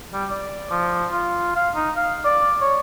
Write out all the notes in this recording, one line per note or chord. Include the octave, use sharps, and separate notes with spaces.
G3
D5
F3
F4
F5
D#4
F5
D5
C#5